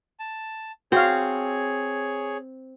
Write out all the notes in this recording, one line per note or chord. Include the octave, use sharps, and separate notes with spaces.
A5
C4 F#4 G#4 C#5 F5